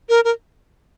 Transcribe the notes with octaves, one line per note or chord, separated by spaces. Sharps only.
A#4
A#4